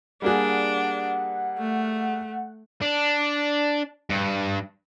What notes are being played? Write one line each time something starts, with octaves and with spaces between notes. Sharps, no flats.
G3 A#3 D4 G#4 F#5
A3
D4
G2